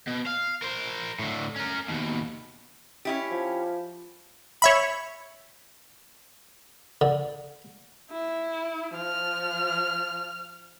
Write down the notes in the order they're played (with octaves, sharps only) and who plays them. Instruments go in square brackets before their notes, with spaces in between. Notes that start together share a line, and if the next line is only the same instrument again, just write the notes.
[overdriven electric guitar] B2
F5
A#4 C5
A2 D3
C#4 A#4
D#2 B2
[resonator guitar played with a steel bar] C#4 E4 G4
[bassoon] F3
[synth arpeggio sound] C#5 E5 B5
[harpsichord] D3
[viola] E4
[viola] F3 [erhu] F6